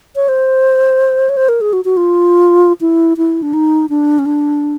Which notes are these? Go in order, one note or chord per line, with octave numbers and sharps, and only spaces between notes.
C#5
C5
C#5
C5
A#4
G#4
F#4
F#4
F4
E4
E4
D4
D#4
D4
C#4
D4